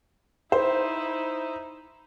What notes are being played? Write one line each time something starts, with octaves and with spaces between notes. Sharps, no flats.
D#4 E4 C5